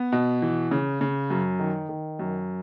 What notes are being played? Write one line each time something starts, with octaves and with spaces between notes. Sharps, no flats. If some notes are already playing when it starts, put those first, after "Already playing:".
Already playing: B3
B2
E3
C#3
C#3
F#2
D#3
D#3
F#2